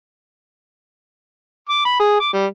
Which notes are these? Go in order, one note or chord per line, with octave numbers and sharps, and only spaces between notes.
D6
B5
G#4
D6
G3